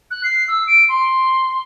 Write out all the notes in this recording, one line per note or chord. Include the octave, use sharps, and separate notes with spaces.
F#6
C7
E6
D7
C6